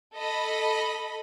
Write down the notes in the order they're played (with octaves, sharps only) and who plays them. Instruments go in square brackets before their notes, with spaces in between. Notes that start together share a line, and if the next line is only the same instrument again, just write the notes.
[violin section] A4 D#5 B5